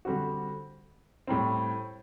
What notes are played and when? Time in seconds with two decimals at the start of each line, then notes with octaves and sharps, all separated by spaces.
0.05 D3 G3 C4 F#4
1.27 A2 G3 C4